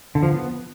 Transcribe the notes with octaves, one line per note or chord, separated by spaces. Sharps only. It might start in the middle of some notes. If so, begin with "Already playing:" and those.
D3
F3
B3